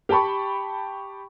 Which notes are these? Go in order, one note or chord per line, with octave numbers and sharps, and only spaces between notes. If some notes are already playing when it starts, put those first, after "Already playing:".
G4 G5 A5 B5 C#6